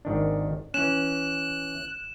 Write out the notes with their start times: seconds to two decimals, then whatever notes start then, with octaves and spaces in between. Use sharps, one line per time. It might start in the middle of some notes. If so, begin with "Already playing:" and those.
0.05 G#1 D#3 D4
0.74 E3 C#4 F#6 E7